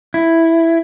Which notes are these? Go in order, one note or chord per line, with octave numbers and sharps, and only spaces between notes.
E4